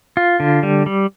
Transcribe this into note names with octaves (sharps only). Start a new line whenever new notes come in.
F4
D3
G3
G3